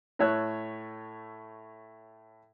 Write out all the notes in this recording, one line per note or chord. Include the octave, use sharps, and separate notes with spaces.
A2 A3 C#5 E6 F#6